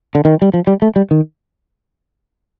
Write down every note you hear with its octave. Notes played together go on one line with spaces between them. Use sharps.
D3
D#3
G3
F3
G3
A3
G3
D#3